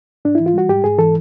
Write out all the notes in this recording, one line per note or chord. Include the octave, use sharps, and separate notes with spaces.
G#2 D4
E3 E4
F4
G3 F#4
G#2 G4
G#2 G#4
E3 A4